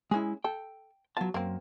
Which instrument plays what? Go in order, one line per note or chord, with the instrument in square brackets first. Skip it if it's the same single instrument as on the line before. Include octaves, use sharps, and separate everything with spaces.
[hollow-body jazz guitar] G#3 E4 [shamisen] C#4 G#4
[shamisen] A4 [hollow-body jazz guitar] G5
[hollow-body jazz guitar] F#3 A5 [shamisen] B3 F4
[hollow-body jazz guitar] F#2 [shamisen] A#3 C4